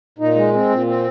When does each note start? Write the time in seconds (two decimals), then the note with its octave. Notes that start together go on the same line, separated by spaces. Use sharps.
0.18 A#2 D#4
0.35 G#3
0.53 C4
0.69 A#2
0.86 C4